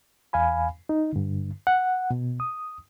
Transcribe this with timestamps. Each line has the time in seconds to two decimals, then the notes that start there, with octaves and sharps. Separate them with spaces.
0.33 E2 F5 G#5 B5
0.89 D#4
1.13 G2 D3
1.67 F#5
2.11 B2
2.40 D#6